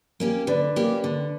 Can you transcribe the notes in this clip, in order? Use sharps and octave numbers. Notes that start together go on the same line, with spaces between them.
A#3 C#4 G4
D3 B4 D5
A#3 C#4 G4
D3